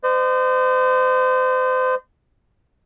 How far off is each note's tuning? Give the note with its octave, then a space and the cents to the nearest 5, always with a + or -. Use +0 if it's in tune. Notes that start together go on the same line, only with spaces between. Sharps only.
C5 -35 D#5 -45